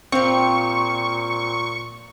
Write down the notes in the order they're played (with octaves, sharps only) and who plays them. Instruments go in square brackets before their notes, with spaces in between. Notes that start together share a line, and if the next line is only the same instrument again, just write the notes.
[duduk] A#2 [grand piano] C4 [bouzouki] F4 G4 [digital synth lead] C#6